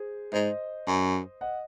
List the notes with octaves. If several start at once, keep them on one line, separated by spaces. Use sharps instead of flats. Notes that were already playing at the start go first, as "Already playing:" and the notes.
Already playing: G#4 C5
G#2 C5 D#5
F#2
D#5 F#5